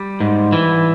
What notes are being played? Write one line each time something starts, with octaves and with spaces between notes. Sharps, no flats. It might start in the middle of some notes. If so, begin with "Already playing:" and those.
Already playing: G3
G#2
E3